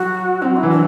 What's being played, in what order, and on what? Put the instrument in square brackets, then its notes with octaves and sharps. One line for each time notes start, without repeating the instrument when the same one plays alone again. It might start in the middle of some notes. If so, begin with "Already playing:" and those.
Already playing: [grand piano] F#3 [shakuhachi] F#4
[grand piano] F#3 [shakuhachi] C4
[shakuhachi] E4
[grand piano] E3
[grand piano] F#3 [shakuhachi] D4